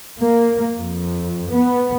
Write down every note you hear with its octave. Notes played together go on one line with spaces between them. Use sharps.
A#3
F2
B3